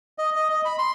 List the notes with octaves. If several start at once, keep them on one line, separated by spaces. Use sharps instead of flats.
D#5
D#5
D#5
B5
C6